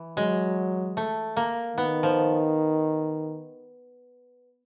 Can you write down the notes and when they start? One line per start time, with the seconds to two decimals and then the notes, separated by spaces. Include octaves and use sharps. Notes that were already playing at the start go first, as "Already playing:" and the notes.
Already playing: E3
0.17 F#3 G#3
0.97 A3
1.37 A#3
1.77 D#3 B3
2.03 F3